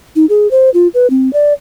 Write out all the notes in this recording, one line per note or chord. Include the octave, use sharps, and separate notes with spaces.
D#4
G#4
C5
F4
B4
C4
D5